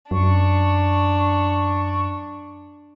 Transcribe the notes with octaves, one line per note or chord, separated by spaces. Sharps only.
F#2 D4 C#6